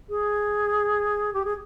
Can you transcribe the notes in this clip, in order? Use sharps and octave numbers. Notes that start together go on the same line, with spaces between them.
G#4
G4
G#4